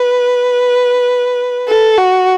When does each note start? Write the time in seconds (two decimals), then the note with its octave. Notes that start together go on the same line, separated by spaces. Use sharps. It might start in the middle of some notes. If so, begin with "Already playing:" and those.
Already playing: B4
1.68 A4
1.98 F#4